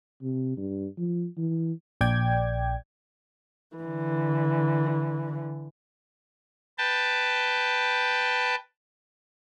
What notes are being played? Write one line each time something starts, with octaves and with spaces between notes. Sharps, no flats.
C3
G2
F3
E3
A#1 D5 G5 G#6
D3 E3
B4 G5 A5